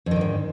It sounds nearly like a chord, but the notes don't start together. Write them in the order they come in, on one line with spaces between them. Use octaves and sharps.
F2 D#3 D3 G#2